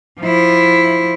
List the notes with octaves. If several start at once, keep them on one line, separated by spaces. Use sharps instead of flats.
F3 E4